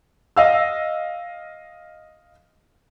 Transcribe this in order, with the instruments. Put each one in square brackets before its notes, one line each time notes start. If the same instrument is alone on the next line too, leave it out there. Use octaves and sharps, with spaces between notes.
[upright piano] D#5 F5 E6